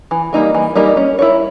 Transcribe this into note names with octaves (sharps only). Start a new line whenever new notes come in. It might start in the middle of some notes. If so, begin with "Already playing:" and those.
E3
G3 A#3 D#4 A#4
E3
G3 A#3 D#4 A#4
C#4
E4 A#4 C#5